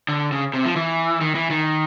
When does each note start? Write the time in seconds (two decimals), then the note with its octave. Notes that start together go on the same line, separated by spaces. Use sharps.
0.09 D3
0.32 C#3
0.54 C3
0.65 F3
0.76 E3
1.21 D#3
1.35 E3
1.50 D#3